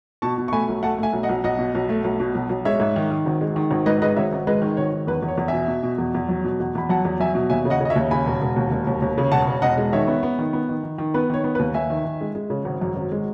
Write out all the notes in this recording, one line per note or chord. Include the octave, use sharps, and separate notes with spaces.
B2 A5 C#6
B2
C#6
A3 G#5 B5
B1
A3 F#5 A5
A3 E5 G#5
B1
D#5 F#5
B1
B1 D#5 F#5
B2
B1
A3
B1
B2
B1
B1
G#3 C#5 E5
G#2
D#3
D#3
G#1
G#3
D#3
G#1
G#2 B4 D#5
G#3 B4 D#5
G#1 C#5 E5
G#1
G#3 B4 D#5
D#3
G#1 C#5
D#3
E2 B4
E2
C#5
E2
B2 E5 G#5
B2
B2
E2
E2
F#3
B2
E2
E2 B5
F#3 F#5 A5
E2
F#3 E5 G#5
B2
D#2 E5 G#5
C#3
D#5 F#5
C#3 D#5
C#5 E5
D#2
C#3 G#5 B5
E1
E1
D#2
E1
D#2
D#2
C#3
E1 F#5 A5
E1
E1 D#5 F#5
G#3
D#3 C#5 E5
B3
B3
D#3
B3
D#3
D#3
D#3
B3 B4
D#3 C#5
B3
B4
D#2
D#2 E5 G#5
D#3
D#3
G#3
G#3
C#3
G#1
F#2
G#1
G#3